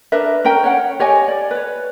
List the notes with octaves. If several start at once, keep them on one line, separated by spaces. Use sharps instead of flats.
D4 A#4 B4 E5
C#4 A#4 G5 A#5
C#5 F#5
G4 C#5 D#5 G#5
D5
B4 C#5